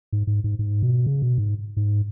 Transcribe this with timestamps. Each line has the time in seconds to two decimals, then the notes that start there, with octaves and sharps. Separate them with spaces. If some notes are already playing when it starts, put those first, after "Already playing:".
0.13 G#2
0.27 G#2
0.44 G#2
0.59 G#2
0.83 B2
1.06 C#3
1.22 B2
1.38 G#2
1.77 G#2